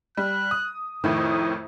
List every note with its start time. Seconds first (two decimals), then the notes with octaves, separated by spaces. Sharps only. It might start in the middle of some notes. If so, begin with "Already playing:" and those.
0.17 G3 F#6
0.51 D#6
1.04 F2 A2 D#3 E4 D#6